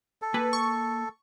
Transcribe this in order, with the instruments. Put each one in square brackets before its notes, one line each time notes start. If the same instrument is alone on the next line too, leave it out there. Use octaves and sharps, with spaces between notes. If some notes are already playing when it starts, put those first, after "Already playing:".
[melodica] A4
[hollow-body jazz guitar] A#3 G#5 [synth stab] B4
[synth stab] C#6